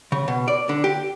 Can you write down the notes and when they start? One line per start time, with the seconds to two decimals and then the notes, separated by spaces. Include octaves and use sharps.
0.12 C#3
0.28 B2
0.48 D5
0.69 D3
0.84 G4